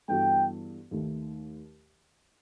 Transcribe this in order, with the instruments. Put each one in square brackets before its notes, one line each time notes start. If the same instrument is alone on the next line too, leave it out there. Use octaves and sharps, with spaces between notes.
[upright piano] G2 E3 B3 F#4 A4 [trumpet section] G5
[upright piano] D#2 D#3 A3